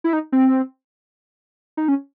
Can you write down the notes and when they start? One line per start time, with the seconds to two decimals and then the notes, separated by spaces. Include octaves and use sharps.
0.04 E4
0.13 D#4
0.32 C4
1.77 D#4
1.88 C#4